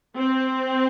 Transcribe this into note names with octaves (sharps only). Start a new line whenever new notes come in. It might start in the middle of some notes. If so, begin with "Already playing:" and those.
C4